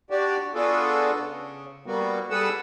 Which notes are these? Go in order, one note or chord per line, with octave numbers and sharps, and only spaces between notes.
D4 F#4 G4 D5
B3 D4 F4 F#4 G#4 A4
C#3
G3 A#3 B3 F#4
G3 G#4 A4 B4 F#5 E6